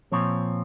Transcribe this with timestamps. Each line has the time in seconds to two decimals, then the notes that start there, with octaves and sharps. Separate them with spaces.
0.12 A#2 F3 C4 C#5